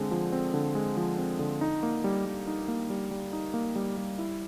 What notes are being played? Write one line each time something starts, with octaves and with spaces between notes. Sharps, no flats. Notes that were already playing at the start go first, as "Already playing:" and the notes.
Already playing: D3 G#3 C4
F3
C4
D3
G#3
F3
C4
D3
D#4
A#3
G3
G3
D#4
A#3
G3
G3
D#4
A#3
G3
G3
E4